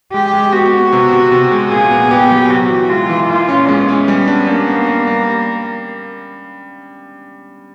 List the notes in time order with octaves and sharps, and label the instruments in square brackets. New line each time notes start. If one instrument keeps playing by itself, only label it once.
[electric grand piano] G#3 [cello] G4
[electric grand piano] G#3
[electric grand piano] B3 [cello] F#4
[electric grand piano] B3
C3
C3
C3
G#3
[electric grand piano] A#2 [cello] G#4
[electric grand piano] B3
[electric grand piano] B3 [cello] G4
[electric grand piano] F#3
[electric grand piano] C3 [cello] F#4
[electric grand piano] E3
[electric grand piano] G#3 [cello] F4
[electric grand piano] E3
[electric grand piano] A#2 [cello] F4
[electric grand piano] C#4
[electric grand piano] G#3 [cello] B3
[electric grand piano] C#4
G3
D4
[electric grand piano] G3 [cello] A#3
[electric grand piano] B3
G3
G3